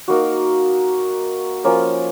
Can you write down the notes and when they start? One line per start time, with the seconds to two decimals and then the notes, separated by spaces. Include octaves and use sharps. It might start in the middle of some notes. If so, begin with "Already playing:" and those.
0.08 A#3 D#4 F#4
1.64 F3 A#3 C#4